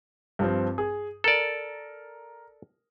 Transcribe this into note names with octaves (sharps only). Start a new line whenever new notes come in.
G2 F3 C4
G#4
A4 A#4 D5